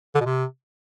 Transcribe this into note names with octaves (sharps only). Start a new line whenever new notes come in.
D3
B2
C3